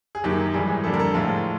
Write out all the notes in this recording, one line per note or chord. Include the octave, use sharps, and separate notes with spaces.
G#4
F#2 D#3 F#3 A#3 G4
G#2 E3 G3 G#4
F2 D3 G3 A#3 A4
A#4
A4
A2 F3 G#3 F4